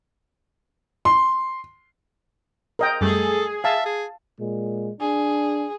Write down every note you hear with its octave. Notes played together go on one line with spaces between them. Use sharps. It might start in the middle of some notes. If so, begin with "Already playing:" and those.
C6
A#4 D#5 G5
F#2 G3 A3 G#4 A4
E5 F5 A5
G#4
A#2 G#3
D4 G#4